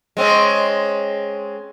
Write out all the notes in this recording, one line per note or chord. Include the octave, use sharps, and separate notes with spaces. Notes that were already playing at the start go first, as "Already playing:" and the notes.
G#3 C4 C#4